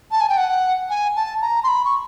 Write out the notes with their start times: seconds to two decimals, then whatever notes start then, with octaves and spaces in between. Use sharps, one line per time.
0.11 A5
0.21 G#5
0.29 G5
0.37 F#5
0.90 G#5
1.16 A5
1.42 A#5
1.64 C6
1.68 B5
1.85 C#6